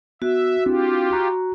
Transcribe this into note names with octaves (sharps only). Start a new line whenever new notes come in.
B3 F#4 E5
C4 D4 E4 F4 G4
A#5 C#6 F#6